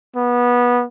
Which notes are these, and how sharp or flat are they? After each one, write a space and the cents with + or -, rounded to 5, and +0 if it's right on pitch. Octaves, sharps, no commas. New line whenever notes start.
B3 -20